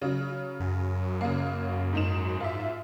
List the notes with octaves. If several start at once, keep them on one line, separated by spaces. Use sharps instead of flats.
C#3 F#3
F#2
C#3 A#3
G#2 D#4 E7
G#2 F4 E5